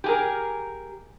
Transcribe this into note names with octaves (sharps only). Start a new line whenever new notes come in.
G4 G#4 A#4